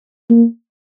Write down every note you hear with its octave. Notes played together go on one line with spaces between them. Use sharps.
A#3